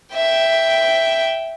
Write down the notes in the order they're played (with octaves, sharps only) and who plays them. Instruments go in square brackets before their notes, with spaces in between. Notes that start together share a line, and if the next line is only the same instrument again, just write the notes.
[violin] E5 G5